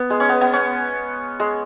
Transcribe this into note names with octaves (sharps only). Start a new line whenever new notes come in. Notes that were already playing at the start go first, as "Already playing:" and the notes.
Already playing: B3
G#3
C#4
B3
B3
C#4
G#3